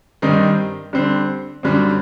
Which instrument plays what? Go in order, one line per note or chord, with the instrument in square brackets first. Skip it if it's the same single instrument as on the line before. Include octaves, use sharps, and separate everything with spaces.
[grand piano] G2 D#3 G3 C4 D#4
D3 G3 C4
F#2 D3 G3 C4